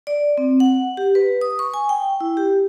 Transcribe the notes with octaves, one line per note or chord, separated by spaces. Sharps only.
D5
C4
F#5
G4
B4
D#6
C#6
G#5
G5
E4
G4